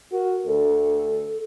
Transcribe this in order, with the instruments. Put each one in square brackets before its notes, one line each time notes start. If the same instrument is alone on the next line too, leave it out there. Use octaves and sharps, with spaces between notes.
[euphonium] F#4 [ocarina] A#4
[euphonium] D2 [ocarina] A4